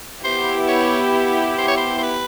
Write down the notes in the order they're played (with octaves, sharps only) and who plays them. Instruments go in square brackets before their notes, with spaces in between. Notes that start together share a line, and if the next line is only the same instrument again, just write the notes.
[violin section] B3 E4 G4 [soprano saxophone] C5
[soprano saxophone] C#5
C5
C#5
C5
C5
B4